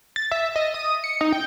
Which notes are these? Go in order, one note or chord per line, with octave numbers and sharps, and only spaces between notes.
A6
E5
D#5
D#6
C#7
D#4
G5